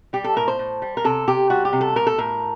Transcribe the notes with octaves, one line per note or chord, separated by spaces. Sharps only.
G3 G4
A4
A2 A#4
C5
A2
G3
A#4
C3 A4
C3 G4
G3 F#4
G4
C3
A4
A2 A#4
A4
A2 A#4